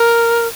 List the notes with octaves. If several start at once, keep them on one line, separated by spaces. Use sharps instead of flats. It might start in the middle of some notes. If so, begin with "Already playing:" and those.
Already playing: A#4